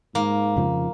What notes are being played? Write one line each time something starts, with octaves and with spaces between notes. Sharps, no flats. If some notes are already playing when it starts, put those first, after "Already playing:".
G#2 A#3
F2 C#3 F3